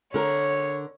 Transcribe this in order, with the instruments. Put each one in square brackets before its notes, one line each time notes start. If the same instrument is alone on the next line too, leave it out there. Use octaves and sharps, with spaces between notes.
[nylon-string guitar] D3 A#4 [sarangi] C#5